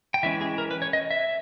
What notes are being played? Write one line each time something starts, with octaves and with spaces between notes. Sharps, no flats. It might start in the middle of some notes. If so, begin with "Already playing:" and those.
G5
E3 G#3 C#4 E5
G#4
A#4
B4
C#5
D#5
E5